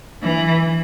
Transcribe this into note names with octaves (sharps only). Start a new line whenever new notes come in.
E3